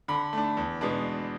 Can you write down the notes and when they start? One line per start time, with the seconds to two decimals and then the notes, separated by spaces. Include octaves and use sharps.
0.08 D3 B5
0.33 A3 D4
0.57 E2
0.81 B2 G#3 B3 D4